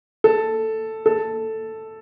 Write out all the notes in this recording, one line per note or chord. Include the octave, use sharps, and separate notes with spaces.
A4
A4